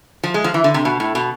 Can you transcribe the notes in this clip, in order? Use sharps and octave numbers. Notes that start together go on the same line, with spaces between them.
F3
G#3
F3
E3
D3
C3
B2
A2
B2